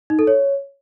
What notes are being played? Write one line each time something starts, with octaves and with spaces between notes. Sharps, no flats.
D#4
A4
C#5